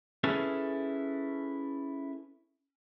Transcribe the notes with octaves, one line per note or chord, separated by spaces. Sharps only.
C#4 E4 G#4 A4 B4